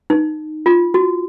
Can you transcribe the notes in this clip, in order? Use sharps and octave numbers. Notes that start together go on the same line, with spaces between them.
D#4
F4
F#4